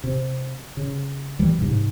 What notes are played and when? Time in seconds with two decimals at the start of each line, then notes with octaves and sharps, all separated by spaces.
0.04 C3
0.77 C#3
1.39 C#2 E3 G3
1.59 G#2 C3